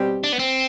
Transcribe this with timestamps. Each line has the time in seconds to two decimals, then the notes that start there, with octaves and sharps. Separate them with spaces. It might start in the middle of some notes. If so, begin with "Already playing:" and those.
Already playing: B2 G3 C4 G4
0.24 D4
0.33 B3
0.39 C4